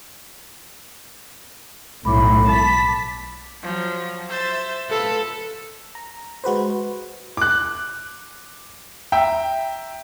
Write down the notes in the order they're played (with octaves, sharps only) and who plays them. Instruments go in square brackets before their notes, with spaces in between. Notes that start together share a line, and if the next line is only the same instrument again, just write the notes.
[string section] B1 A2 [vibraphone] B5 D6
[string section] A5 B6
[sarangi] F3 [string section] F#3
[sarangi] C5 [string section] E5 E6 A6
[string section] F4 [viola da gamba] A4 [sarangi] B4
[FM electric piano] A#5
G#3 F#4 B4 C5
[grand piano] D6 F#6
E5 G5 A#5